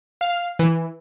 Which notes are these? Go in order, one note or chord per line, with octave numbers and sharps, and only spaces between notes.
F5
E3